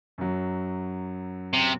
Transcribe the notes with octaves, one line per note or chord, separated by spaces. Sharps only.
F#2 F#3
C3